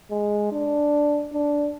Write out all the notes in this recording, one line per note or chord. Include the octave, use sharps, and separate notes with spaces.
G#3
D4
D4